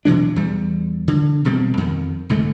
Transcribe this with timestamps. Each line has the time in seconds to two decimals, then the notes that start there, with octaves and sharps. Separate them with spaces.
0.05 B2 E3 F#3 D4
0.36 E2 G3
1.08 D3
1.45 E1 B2 G3 C4
1.78 F2 D#3
2.29 C2 G#2 D3 A3